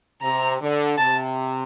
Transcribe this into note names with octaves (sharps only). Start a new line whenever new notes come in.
C3 A#5
D3
C3 A5